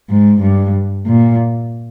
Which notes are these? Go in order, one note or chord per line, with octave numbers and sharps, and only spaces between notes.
G#2
G2
A#2